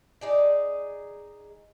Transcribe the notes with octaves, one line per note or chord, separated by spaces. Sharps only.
D#4 G#4 D5